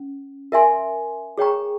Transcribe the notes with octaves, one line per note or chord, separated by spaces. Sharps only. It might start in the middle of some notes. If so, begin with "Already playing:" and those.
Already playing: C#4
A#4 E5 G#5 C6
G#4 C#5 G5 A#5 C#6